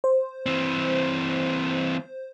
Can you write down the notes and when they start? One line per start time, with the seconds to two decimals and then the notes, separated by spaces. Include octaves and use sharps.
0.04 C5
0.46 E3 C4